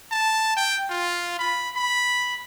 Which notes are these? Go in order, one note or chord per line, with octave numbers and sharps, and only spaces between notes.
A5
G5
F4
B5
B5